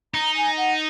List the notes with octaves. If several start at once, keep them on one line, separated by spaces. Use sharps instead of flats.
D#4 A#5
G#5
F#5